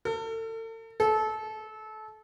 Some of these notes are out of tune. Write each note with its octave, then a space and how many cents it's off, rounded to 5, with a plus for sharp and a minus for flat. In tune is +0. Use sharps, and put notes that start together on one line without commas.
A4 +40
A4 -25